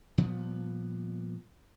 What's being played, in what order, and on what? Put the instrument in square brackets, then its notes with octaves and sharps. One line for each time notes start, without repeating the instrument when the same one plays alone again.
[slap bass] A#2 F3 G3 B3